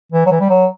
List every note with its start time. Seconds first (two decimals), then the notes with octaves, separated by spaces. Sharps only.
0.12 E3
0.26 F#3
0.31 E3
0.40 G3
0.50 F#3